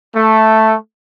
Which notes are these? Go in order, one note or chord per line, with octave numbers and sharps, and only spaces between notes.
A3